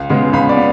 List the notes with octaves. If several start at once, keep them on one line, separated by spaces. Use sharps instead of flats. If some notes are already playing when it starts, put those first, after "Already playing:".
Already playing: C#2
C#3 G#3 B3
C#2 B5
D5
B3